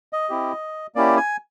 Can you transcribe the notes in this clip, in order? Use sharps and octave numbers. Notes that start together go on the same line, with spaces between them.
D#5
C4 E4 G4
A#3 C#4 E4 G4 D5
G#5